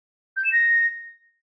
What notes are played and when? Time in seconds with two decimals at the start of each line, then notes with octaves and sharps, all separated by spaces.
0.37 G6
0.44 E7
0.52 A#6